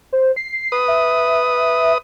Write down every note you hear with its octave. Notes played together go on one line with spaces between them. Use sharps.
C5
C7
B4 D#6
E5